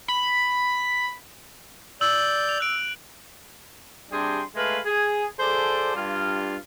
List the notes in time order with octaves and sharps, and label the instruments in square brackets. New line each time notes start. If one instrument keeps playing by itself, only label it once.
[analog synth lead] B5
[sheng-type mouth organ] D5 G6 [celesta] E6 [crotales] F#7
[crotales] F7
F#6 D7
[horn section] G2 C3 D4 G#4 G5 C6
G#3 A3 A4 B4 F5
G#4
F3 G#4 A4 C5 D5
G2 F4